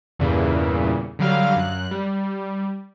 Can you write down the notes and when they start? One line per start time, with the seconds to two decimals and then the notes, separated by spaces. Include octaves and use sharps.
0.19 E2 G2 A#2 C#3 E3
1.19 D3 F#3 G3 F5
1.56 F#2 F#6
1.91 G3